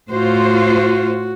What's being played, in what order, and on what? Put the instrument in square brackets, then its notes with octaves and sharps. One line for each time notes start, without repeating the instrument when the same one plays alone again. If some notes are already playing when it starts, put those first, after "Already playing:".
[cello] A2 [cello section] F4 C5 [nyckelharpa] F#4